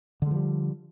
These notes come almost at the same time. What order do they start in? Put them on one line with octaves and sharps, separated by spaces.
D3 G#3 F3 G3